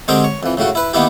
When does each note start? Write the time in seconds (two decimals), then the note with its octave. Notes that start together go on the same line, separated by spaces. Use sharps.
0.08 D3 G#3 C4 G4 G#4 A#4
0.24 C#5
0.43 F2 E3
0.57 A2 C#3 A3 F#4
0.75 E4 B4
0.93 D#3 A#3 B3 D#4 E4 G4